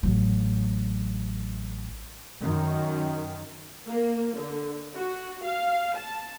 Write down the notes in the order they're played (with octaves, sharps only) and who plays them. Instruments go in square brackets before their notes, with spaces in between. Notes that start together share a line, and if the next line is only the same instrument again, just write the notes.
[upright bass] A1 F#3
[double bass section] F#2 D#3
[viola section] A#3
D3
F#4
F5
A5